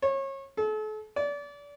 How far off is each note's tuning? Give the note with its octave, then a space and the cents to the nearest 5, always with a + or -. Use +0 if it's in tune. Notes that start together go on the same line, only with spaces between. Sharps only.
C#5 -30
A4 -40
D5 -30